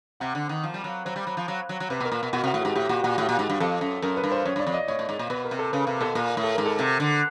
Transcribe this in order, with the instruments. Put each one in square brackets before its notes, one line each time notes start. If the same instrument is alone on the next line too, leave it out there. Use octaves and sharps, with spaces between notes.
[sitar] C3 [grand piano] F#5
[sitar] D3
D#3
F3
G3
F#3
[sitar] F#3 [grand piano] C5
[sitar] G3
F#3
F3
F#3
F#3
F#3
[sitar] C3 [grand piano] B4
[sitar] B2 [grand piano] A#4
[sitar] A#2
B2
[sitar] B2 [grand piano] F#4
[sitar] C3 [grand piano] F#4
[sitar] A2
[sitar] G#2 [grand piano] G4
[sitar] A2 [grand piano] G4
[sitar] A#2 [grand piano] F#4
[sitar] A#2 [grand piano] F#4
[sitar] A2 [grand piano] G4
[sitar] A#2
G#2
G2
[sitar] F2 [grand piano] A4
[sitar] F#2
[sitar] F#2 [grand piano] A#4
[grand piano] B4
[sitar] G2
[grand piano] C5
[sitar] F#2 [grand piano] C#5
[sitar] G2 [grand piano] D5
[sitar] F2
[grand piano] D#5
[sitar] A2 [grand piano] C#5
[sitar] A2
G#2
A#2
[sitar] B2 [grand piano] B4
[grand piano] A#4
[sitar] C3
[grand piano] A4
[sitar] C#3 [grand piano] B4
[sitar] C3 [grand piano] A#4
[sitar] B2 [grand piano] A4
[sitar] A#2 [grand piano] A#4
[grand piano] A#4
[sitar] A2
[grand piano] A4
[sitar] G#2 [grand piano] A#4
[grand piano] A4
[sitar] C3
D3